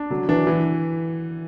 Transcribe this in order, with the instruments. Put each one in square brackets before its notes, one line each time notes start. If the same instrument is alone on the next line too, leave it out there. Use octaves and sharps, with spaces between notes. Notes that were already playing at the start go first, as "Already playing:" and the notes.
Already playing: [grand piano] D4
[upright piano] D3 [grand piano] F#3
[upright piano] E3 [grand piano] D4
[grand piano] E3